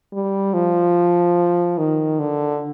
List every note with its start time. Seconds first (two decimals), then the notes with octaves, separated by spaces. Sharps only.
0.13 G3
0.54 F3
1.78 D#3
2.19 D3